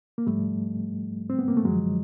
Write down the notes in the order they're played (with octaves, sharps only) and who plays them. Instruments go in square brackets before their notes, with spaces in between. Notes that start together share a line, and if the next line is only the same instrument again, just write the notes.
[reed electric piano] A#3
G#2 F3 G3 A3
C4
B3
A#3
A3
F#2 D3 F3 F#3 G#3